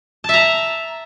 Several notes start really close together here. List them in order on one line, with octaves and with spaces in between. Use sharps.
A5 E5 A#5